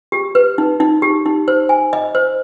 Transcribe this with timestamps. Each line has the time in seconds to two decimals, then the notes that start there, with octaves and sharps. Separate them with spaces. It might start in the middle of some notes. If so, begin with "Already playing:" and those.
0.12 G4
0.35 B4
0.58 D#4
0.80 D#4
1.02 G4
1.26 D#4
1.48 C5
1.69 G#5
1.93 D#5
2.15 C5